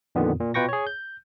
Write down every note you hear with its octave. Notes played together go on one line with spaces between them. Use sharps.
F2 A#2 D3 D#3 B3
A#2
B2 F4 B4 G5 C#6 A#6
G#4 C#5
G6